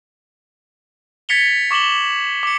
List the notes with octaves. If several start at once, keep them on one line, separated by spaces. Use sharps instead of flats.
G#6 A6 B6 C#7 F7 G7
C#6 D6 E7 F#7 G7
D6 C#7